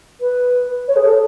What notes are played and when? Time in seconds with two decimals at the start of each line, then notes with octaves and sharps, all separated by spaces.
0.20 B4
0.87 C#5
0.96 G#4
1.04 A4